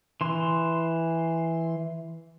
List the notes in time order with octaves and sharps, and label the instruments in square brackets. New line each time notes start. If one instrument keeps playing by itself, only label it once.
[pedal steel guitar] E3 C6